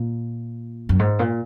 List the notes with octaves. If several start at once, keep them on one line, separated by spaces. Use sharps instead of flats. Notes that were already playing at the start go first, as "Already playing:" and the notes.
Already playing: A#2
F#2
G#2
A#2